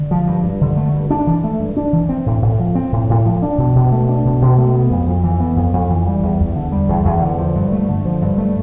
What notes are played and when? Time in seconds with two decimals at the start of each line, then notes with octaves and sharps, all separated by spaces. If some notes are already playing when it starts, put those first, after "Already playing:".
Already playing: D3
0.11 F3
0.27 G2
0.44 G2
0.61 D3
0.77 A3
0.94 G2
1.10 D4
1.27 E3
1.44 A3
1.60 G2
1.77 D4
1.93 E3
2.09 C4
2.26 A2
2.42 A2
2.60 F3
2.75 C4
2.92 A2
3.09 A2
3.25 F3
3.42 D4
3.58 B2
3.75 B2
3.92 A3
4.09 D4
4.25 B2
4.42 B2
4.58 A3
4.75 B3
4.90 F2
5.08 F2
5.24 E3
5.40 B3
5.56 F2
5.73 F2
5.91 E3
6.07 G3
6.23 E2
6.40 E2
6.56 D3
6.72 G3
6.89 E2
7.05 E2
7.22 D3
7.38 F3
7.55 G2
7.72 A3
7.89 D3
8.05 F3
8.22 G2
8.38 A3